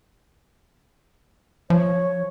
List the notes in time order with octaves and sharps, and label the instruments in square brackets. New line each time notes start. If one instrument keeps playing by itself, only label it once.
[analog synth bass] F3 [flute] C#5